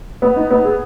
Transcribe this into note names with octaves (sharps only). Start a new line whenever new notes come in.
B3
D#4
B3
G#4